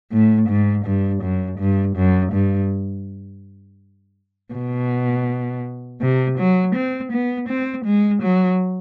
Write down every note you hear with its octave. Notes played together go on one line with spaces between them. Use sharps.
A2
G#2
G2
F#2
G2
F#2
G2
B2
C3
F#3
C4
B3
C4
G#3
F#3